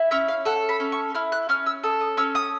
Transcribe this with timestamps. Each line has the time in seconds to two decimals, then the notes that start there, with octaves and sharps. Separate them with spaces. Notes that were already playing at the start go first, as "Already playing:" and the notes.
Already playing: E4
0.11 C#4 E5
0.28 F5
0.45 A4 F#5
0.69 B5
0.80 C#4
0.92 C#6
1.15 E4 F6
1.32 F#6
1.49 C#4 F6
1.66 E6
1.84 A4 D#6
2.01 D#6
2.17 C#4 E6
2.35 D#6